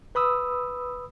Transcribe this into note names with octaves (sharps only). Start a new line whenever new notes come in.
B4 B5 D#6 E6